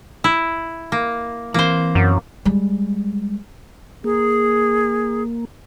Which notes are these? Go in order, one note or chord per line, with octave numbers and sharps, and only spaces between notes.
E4
A#3
E3 A#3 C4 C5
F#2
G3 G#3
A#3 G#4